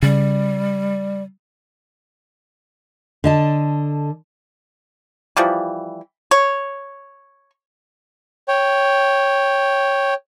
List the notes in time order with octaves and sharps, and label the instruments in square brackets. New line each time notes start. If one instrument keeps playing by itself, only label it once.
[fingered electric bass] C#3 [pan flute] G3
[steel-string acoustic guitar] D3 D#5 A5
[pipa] E3 F3 G3
C#5
[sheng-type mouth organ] C#5 G5